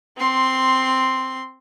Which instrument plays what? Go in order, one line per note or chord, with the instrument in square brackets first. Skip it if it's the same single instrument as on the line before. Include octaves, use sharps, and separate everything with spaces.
[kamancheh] C4 C6